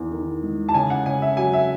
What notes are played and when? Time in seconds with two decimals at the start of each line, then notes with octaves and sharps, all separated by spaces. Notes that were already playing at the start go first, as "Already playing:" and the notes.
Already playing: E2 D#3
0.11 D#3
0.43 G#3
0.69 A5
0.74 C#3 G#5
0.90 F#5
1.06 C#3 G#5
1.22 E5
1.37 F#3 G#5
1.53 E5